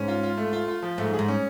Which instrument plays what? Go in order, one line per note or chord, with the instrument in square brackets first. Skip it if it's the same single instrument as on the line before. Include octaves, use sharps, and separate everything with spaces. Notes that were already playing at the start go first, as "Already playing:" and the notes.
Already playing: [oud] G#2 [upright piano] C#4
[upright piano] F4
F4
A3
F4
F4
F3
[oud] G#2 [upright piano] A3
[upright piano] G#4
[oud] G#2
[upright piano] C#4